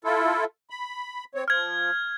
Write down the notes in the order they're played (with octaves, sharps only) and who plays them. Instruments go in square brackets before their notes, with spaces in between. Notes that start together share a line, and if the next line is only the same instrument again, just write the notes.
[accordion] E4 F4 A4
B5
C4 C#5
[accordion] F3 [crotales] F6 G#6